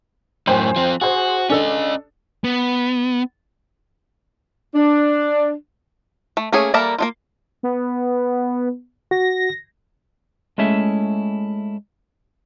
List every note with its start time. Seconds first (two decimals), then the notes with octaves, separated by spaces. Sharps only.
0.47 F#2 A2 C5 G5 G#5
0.76 F3 C4
1.01 F#4 G#4 C5
1.50 C#4 D4 A4 D#5
2.44 B3
4.75 D4
6.37 A3
6.53 A3 A#3 C#4 G#4
6.74 G3 A#3 A4 A#4 E5
6.98 A#3 D#4 F4
7.63 B3
9.11 F#4 A#6
10.58 G#3 A3 C#4 E4 G#4 E5